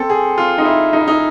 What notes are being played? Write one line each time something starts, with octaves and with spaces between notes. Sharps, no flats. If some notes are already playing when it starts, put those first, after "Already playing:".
Already playing: C4 A4
G#4
F4
D#4
E4
D#4
E4
D#4